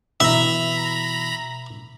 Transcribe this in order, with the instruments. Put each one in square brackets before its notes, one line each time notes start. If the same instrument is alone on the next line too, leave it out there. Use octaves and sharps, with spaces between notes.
[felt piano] B2 E3 B6 [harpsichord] E5 [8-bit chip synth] A#5 B5